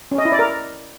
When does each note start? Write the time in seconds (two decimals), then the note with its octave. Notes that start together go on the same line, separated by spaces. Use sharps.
0.11 C#4
0.18 D#5
0.25 E4
0.32 D5
0.39 A#4